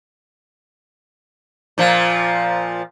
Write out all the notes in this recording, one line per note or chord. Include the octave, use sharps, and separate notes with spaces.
A#2 F3